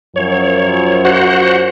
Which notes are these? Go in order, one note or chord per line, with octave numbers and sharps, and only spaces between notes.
F#2 F3 C#5
F#4 C5 F#5